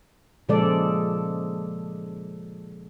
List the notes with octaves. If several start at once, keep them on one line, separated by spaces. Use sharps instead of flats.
A#2 C#3 F3 G#3 A4 D5